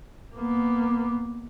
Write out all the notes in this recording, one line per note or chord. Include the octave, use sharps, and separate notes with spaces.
A#3 B3